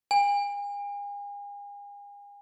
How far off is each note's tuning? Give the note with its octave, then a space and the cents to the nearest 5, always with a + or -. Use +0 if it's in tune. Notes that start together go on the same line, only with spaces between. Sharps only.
G#5 -40